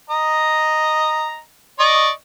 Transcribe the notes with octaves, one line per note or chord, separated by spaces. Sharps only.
D#5 A#5
D5 D#5 C#6